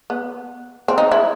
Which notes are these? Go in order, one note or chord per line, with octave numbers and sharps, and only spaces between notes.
B3
C4
D#4
E4